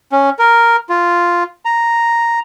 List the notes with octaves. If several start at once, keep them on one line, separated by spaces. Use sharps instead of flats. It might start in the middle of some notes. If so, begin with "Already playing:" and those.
C#4
A#4
F4
A#5